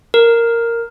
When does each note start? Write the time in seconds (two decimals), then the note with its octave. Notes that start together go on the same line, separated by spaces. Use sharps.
0.14 A#4